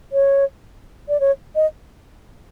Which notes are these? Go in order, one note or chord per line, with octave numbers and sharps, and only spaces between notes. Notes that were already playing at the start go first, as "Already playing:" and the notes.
C#5
D5
C#5
D#5